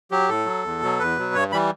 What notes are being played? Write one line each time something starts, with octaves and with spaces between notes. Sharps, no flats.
F#3 G4
A2 A4
F#3
E2
B2 F#3
E2 B4
B2 F#3
G2 C#5
E3 G3 B5